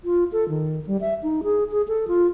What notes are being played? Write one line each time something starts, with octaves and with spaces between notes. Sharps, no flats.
F4
A4
D#3
G3
E5
D#4
G#4
G#4
A4
F4